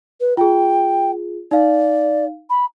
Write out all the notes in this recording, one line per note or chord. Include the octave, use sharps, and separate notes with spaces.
B4
F4 G#4 G5
D#4 D5 F5
B5